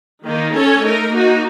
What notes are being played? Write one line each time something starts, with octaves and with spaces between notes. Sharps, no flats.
D#3 A#3 D#4
C#4 A4 C#5
A3 D#4 A#4
A#3 D#4 F#4